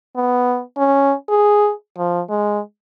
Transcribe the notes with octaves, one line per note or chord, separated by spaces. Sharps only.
B3
C#4
G#4
F3
G#3